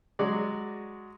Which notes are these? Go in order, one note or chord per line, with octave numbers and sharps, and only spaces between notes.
F#3 G#3 F#4 D5